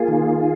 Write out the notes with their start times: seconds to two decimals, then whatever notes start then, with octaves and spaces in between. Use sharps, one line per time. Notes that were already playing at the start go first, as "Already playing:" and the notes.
Already playing: A#3 F4 G#4
0.08 D#3